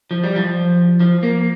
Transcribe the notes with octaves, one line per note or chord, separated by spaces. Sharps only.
F3
G3
F3
F3
A#3